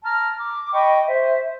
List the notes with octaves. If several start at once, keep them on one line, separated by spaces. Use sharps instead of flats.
A5 A#5 F6
D6
D#5 G5 B5 C#6
C5 E5